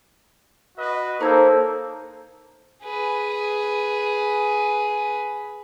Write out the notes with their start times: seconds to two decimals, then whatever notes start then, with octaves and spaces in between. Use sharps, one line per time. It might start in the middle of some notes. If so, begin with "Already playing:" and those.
0.77 F#4 B4 D#5
1.21 A#3 D#4 A4 C5 C#5 E6
2.83 G#4 B4